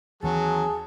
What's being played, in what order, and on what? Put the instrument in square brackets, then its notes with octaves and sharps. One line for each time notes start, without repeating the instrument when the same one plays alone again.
[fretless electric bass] D#2 E3 C4 [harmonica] F#3 [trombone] G#4 [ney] A5